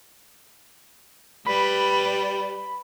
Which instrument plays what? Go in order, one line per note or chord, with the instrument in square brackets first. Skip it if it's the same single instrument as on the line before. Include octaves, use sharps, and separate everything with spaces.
[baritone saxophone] G3 [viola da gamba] B4 [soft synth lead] B5